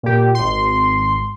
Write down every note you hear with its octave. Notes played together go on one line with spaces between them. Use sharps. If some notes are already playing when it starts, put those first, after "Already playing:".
A#2 G4
G#1 C6